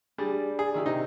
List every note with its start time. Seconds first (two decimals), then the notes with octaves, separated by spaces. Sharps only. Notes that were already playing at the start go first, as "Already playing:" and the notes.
0.18 G3 D4 G#4 D5
0.59 G#4
0.74 D#3 E4 G4
0.86 C3 D#4 G4